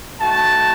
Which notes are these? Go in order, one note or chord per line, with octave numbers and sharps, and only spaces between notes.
A3 D#4 F#4 A5